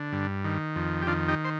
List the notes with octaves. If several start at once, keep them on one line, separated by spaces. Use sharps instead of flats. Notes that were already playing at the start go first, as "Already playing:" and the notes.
Already playing: D3
G2
D#3
F2
G4
D#3 D4 F4
D#4 G4
C5